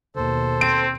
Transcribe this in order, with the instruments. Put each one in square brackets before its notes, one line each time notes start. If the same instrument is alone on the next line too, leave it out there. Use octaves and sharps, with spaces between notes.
[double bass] D#2 B2 [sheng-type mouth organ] A4 C5
[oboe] C4 [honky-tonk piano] D7